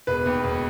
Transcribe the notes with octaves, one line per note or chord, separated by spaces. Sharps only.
E1 B4
D#2
E1